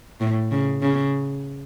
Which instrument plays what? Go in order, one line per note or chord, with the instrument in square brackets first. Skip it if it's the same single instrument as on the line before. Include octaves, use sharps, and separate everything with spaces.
[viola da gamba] A2
C#3
C#3